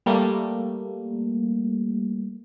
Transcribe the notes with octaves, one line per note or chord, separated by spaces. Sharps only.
G3 A3 A#3